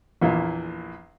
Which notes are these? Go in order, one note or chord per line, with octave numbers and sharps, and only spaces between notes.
A#1 E2 A#2